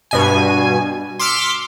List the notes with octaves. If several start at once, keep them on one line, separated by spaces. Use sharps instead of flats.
G2 B2 G#5
C6 D6 E6 F6 B6 C#7